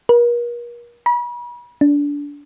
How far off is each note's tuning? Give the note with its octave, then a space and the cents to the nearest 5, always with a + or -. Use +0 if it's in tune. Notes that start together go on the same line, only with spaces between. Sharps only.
A#4 +40
B5 -40
D4 -25